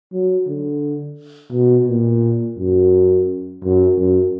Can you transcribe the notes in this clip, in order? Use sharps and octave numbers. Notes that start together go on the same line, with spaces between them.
F#3
D3
B2
A#2
F#2
F#2
F#2